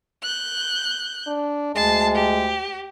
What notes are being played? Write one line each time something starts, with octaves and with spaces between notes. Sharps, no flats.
F#6 G6
D4
D2 G#3 A5 C7
G4